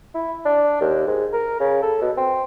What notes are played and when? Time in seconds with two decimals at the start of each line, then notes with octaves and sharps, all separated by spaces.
0.15 E4
0.46 D4
0.81 D#2
1.07 G#2
1.33 A#4
1.60 C#3
1.82 A4
2.02 B2
2.17 C4